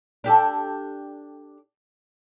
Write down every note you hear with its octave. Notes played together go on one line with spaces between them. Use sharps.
D4 G4 A4